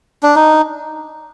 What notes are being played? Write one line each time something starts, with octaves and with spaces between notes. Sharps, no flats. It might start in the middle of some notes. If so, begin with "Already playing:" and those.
D4
D#4